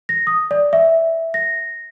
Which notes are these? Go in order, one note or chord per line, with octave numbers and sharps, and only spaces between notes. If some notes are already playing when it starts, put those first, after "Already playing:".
A#6
D#6
D5
E5
A#6